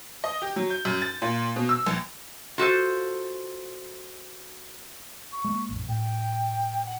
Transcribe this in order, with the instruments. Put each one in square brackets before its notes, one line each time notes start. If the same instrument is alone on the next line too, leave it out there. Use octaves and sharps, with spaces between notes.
[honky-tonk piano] D#5
G4
F#3
G6
F#2
A6
A#2
B2
E6
A#1
[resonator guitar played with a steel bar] F4 F#4 A4 C5
[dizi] C#6
[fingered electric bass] G#3 A#3
A1 F2
[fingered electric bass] A2 [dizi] G5
[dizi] F#5